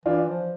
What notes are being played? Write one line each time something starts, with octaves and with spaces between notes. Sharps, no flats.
E3 D4 F4
F3